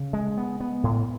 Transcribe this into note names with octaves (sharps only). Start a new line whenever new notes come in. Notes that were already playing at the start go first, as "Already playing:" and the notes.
Already playing: C#3
G#3
B3
B3
A2